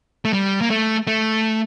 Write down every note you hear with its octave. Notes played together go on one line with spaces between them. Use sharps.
A3
G3
A#3
A3
A3